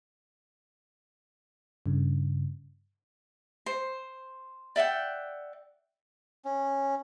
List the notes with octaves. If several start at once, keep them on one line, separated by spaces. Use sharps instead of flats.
G2 C#3
C5
D5 E5 F#5 G5
C#4